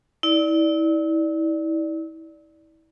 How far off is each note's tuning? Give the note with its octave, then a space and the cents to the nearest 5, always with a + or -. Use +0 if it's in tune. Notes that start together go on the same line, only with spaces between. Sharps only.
E4 -35 D5 +0